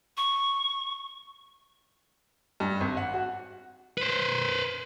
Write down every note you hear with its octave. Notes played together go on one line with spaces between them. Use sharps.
C#6
G2
G#1
F#5
F#4
B4 C5